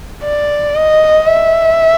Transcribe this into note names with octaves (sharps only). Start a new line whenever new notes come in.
D5
D#5
E5